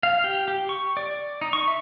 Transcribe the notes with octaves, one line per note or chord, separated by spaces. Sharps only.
F5
G4
G4
C#6
D5
D#4
C#6
E5